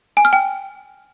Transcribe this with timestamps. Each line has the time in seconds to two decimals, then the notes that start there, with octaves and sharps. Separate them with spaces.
0.17 G#5
0.25 F6
0.33 G5